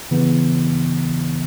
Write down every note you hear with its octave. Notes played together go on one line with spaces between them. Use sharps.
C#3 E3 B3